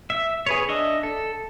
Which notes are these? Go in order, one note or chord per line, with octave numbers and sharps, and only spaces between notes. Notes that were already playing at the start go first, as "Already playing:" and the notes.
E5
G#4 B4 C#5
D4 D#5 E5
A4